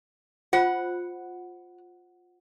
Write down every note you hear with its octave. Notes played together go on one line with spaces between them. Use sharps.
F4 C5 F#5 B5